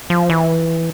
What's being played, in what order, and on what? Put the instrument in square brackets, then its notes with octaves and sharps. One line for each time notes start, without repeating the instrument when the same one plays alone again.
[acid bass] F3
E3